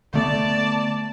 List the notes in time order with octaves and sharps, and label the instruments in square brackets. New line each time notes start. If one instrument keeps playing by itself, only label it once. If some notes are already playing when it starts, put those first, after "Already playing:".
[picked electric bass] D3 A3 B3 [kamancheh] D5 A5